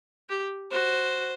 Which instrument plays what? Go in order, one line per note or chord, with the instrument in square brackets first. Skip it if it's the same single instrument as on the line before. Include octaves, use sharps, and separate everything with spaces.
[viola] G4
[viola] F#4 [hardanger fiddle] C5